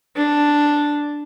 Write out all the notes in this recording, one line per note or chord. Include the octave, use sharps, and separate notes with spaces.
D4